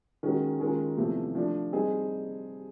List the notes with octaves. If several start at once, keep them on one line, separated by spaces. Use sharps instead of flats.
D#3 G#3 C#4 F#4 A#4
D#3 G#3 C#4 F4 A#4
E2 C3 F3 A3
F3 A3 D4
G3 C4 D#4 G#4